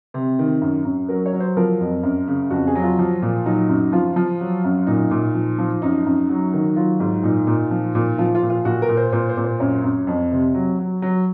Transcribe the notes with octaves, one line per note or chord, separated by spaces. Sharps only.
C3
D#3
F#2
F#2
F#3 A#4
C#5
F#3
C5
F3 A#4
F2
F#2
C#3
F2 F#4
G#4
F#3
F4
F3
A#2
F#3 D#4
F#2
F3 F4
F3
F#3
F#2
A#2 D#4
A#2
F3
F3
F#2 D#4
F#2
F#3
D#3
F#3 F4
G#2
A#2 D#4
A#2
F3
A#2
F3 F4
F4
A#2
F4
A#2 F#4
A#4
A#2
C5
A#2 C5
C5
A#2
C5
F#2 C#5
F#2
F2
C3
F#3
F#3
F#3